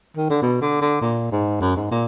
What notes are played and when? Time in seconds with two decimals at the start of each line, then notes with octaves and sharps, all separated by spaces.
0.17 D#3
0.30 D3
0.42 B2
0.61 D3
0.81 D3
1.01 A#2
1.32 G#2
1.61 F#2
1.76 G#2
1.91 A#2